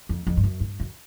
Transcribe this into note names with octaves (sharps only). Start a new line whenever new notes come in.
F2
F2
G2
F#2
G2
F#2